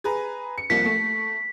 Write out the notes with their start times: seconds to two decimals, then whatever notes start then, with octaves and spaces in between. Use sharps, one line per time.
0.04 G#4 B4 A#5
0.58 C#7
0.70 C2 F3 A#3 B6
0.85 A3